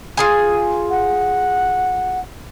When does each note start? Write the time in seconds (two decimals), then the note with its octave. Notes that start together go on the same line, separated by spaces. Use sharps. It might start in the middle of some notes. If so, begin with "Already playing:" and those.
0.17 F4 G#4 G#5
0.90 F#5